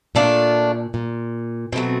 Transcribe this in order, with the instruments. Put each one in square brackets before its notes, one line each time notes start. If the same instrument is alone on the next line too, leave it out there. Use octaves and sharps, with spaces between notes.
[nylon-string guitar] A#2 [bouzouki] A3 D4 F4
[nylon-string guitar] A#2
[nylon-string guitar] B2 [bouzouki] F#3 A3 C4